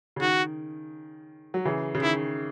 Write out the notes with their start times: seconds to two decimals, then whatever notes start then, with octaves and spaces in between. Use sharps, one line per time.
0.16 C#3
0.21 D#3 F#4
1.54 F#3
1.65 C#3 E3
1.95 C#3
2.02 D#3 E4